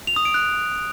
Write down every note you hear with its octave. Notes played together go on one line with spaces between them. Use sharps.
F7
D#6
D7
F#6